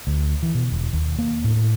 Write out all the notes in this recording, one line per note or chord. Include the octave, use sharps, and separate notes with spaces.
D2
E3
B2
E1
D#2
A#3
A2